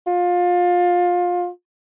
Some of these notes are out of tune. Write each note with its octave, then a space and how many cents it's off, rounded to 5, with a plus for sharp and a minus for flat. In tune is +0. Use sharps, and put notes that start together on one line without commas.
F4 +25